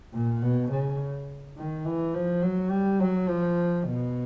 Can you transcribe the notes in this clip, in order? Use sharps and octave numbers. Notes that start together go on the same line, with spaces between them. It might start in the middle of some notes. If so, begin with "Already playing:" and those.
A#2
B2
C#3
D#3
E3
F3
F#3
G3
F#3
F3
B2